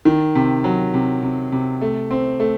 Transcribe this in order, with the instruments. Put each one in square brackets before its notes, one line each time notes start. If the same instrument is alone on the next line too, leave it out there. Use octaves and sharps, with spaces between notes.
[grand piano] D#3
C3
F#3
C3
C3
C3
A3
C4
A3